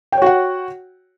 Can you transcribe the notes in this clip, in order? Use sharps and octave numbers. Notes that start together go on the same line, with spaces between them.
F#4 C#5 F#5 G5